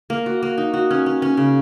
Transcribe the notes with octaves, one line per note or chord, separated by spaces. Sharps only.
A#3
F#4
A#3
D#4
F#4
C#4
C#4
C#4
C#3